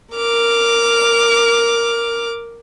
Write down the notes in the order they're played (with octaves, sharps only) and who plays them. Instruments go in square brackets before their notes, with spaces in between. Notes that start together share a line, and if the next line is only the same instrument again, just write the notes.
[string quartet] A#4 D6 F6